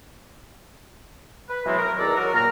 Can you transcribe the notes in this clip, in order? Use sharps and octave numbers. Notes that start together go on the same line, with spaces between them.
B4
B2 E3 F#3 G#3 A3 C4
A#4
E2 D#3 E4 A4 D5 A#5
F#3 F#4 A#4
A#2 A#5 F6